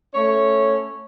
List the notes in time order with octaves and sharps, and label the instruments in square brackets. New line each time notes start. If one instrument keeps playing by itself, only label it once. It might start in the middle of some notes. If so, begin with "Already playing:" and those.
[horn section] A3 C#4 C#5